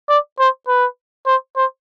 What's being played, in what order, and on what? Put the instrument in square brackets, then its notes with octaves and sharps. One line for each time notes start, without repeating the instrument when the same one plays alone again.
[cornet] D5
C5
B4
C5
C5